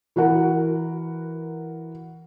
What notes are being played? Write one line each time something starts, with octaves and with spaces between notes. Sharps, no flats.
E3 F#4 A#4 F#5